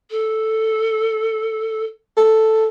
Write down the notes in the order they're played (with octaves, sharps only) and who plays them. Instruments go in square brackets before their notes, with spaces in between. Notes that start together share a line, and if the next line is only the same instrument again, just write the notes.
[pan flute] A4
[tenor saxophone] A4